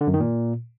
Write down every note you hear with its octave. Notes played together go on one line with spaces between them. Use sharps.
D3
F#2
D#3
A#2